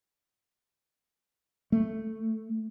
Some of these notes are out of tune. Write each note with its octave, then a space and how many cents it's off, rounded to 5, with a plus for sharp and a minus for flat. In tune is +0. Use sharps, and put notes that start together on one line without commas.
A3 +5